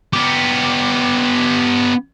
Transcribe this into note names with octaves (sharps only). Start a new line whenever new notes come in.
B3 G4